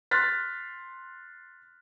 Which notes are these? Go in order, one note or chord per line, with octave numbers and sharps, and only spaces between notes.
C6 F6 F#6 A6 B6